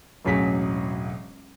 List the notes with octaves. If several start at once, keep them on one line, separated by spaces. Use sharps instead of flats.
E1 A1 F#3 G#4 B6